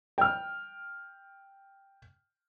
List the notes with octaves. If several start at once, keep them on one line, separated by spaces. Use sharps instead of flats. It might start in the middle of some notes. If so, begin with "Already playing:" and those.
G5 F6